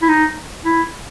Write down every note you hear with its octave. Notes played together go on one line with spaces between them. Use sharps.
E4
D#4
E4